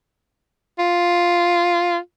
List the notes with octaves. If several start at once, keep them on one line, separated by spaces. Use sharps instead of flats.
F4